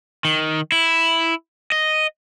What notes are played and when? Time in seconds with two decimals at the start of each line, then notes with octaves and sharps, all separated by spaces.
0.25 D#3
0.72 E4
1.72 D#5